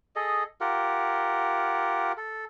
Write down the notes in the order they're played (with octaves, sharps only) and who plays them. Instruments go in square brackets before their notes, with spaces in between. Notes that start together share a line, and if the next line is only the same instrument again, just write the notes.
[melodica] G#4 A4 D#5
F4 G4 A#4 F#5
A4